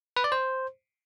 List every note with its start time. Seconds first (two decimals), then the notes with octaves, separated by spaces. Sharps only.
0.16 B4
0.24 D5
0.32 C5